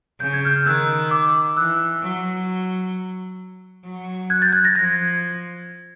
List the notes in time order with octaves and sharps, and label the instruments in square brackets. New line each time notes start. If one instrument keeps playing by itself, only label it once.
[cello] C#3 [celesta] G6
[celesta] G#6
F6 G6
[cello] D#3 [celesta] E6 F#6
[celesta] D6 E6
[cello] E3 [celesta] E6 F#6
[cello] F#3
F#3
[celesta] F#6 G#6
G6 A6
F#6 G#6
G#6 A#6
[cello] F3 [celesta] G#6 A#6